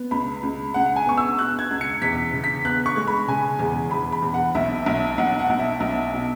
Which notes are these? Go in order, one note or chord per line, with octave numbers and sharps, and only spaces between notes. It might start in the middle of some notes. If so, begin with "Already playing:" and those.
Already playing: B3
C#2 B5
C#2
C#2 F#5
F#5
G#5
B3 C#6
E6
B2 F#6
G#6
C#2
C#7
E2 B6
C#3
B6
B3 F#6
C#6
G#3
B5
C#3 G#5
E2
E2 B5
B5
E2
F#5
B1 E5
B1
B1 F#5
F#5
B1
E5
B1
B2